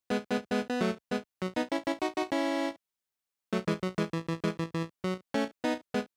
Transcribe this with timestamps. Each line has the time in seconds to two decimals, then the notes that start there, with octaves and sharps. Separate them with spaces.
0.10 G#3 B3
0.31 G#3 B3
0.51 G#3 B3
0.70 B3
0.81 F#3 A3
1.11 G#3 B3
1.42 F#3
1.56 B3 D#4
1.72 C#4 E4
1.86 C#4 E4
2.02 D#4 F#4
2.17 D#4 F#4
2.32 C#4 E4
3.53 F#3 A3
3.67 E3 G#3
3.83 F#3
3.98 E3 G#3
4.13 E3
4.28 E3
4.44 E3 G#3
4.58 E3
4.74 E3
5.04 F#3
5.34 A3 C#4
5.64 B3 D#4
5.94 G#3 B3